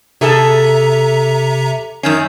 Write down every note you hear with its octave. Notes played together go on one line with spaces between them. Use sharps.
C3 G#4 A4 E5 A5 A#5
F#2 D#3 C#4 D#6 G6 C7